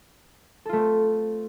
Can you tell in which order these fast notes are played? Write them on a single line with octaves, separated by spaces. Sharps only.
A4 F4 A3 C4